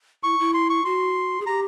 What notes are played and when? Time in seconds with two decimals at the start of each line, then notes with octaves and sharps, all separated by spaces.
0.23 E4 C#6
0.39 E4
0.54 C6
0.70 C#6
0.85 F#4 C6
1.40 G#4
1.46 G4 A#5